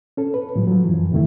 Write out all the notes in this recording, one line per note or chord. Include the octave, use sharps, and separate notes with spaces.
C#4 A4
B4
A2 F3 G3
F3 F#3
F#2 E3
E2 C3 D#3 A3 E4